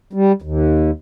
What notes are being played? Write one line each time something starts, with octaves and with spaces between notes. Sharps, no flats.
G3
D#2